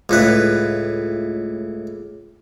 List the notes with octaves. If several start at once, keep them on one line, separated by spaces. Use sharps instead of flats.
C#2 A2 B4